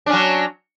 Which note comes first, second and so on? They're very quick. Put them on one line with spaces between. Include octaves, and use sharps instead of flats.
D4 C#4 F#3